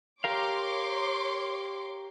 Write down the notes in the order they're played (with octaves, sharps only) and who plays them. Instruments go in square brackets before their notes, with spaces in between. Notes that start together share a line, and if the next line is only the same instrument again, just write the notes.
[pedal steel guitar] G4 A#4 F5 [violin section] C#5 C6 D6